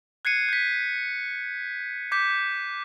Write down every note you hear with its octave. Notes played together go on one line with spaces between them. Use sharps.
F#6 G#6 C7 C#7 D#7
G6 B6
D6 G6 B6